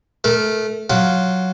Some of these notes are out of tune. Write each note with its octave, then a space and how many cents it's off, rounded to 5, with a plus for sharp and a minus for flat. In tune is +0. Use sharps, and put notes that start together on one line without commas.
A3 -20 A#4 +0
F#3 +0 F4 +0 F#5 +30